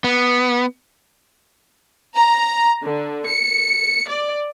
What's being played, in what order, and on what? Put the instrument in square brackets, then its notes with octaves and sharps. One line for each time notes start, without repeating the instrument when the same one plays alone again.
[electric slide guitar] B3
[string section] A#5
D3
C#7
D5